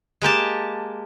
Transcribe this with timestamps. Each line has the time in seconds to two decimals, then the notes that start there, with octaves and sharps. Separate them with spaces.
0.22 G#3 A#3 G4 A5